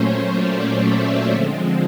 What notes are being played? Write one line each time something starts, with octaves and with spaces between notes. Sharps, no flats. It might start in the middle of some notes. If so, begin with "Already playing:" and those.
Already playing: A#2 F#3 A3 C#4 C5 C#5
D5
E5
D3 F3 G#3 C4